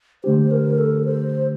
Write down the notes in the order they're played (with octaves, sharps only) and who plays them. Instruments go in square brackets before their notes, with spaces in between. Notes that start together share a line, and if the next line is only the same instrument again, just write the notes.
[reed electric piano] D3 A3 D4 G4 [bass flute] C5
[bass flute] A#4
A4
C5